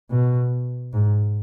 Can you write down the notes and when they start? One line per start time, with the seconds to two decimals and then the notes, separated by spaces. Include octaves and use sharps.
0.11 B2
0.93 G#2